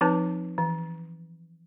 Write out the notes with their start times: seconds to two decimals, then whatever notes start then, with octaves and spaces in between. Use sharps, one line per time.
0.01 F3 C4 D#4 B4 A5
0.58 E3